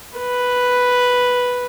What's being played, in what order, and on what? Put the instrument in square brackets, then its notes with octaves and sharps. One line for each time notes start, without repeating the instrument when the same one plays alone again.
[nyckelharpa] B4